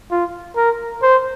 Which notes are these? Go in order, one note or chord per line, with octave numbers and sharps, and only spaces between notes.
F4
A#4
C5